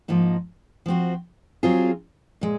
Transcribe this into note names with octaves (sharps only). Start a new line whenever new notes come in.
G#2 F3 A#3 D#4
F3 C4 F#4
F#3 C4 F4 G#4
A#2 G#3